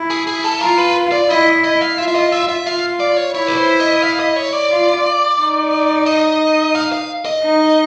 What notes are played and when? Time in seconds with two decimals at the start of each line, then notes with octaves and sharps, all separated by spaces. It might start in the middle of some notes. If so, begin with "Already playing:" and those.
Already playing: E4
0.10 G#4
0.27 G#4
0.44 A4
0.61 F4 A#4
0.78 B4
1.12 D5
1.30 E4 D#5
1.64 D#5
1.81 F5
1.97 F4 E5
2.08 E5
2.15 D#5
2.32 E5
2.49 E5
2.66 F4 F5
3.00 D5
3.17 C#5
3.34 E4 C#5
3.47 B4
3.57 C5
3.80 D#5
4.02 F5
4.20 D#5
4.36 C#5
4.53 D5
4.71 F4
5.39 D#4
6.06 D#5
6.75 F5
6.92 F5
7.25 D#5
7.43 D#4